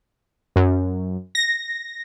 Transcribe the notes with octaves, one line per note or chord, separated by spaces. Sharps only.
F#2
A#6